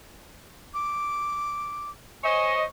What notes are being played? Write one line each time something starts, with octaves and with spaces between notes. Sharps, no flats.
D6
C5 C#5 D#5 G#5